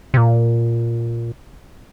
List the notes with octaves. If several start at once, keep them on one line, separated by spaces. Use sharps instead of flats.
C3
A#2